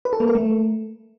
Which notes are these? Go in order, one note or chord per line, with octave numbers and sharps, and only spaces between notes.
B4
A4
A#3
A#4
A3